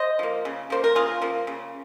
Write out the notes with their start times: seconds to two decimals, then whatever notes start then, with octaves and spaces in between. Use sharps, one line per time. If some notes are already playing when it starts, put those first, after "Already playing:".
Already playing: C5 D#5
0.19 F3 A#3
0.45 C#3
0.70 F3 A#3 C5
0.84 A#4
0.95 C#3 F4 G#4
1.22 F3 A#3
1.47 C#3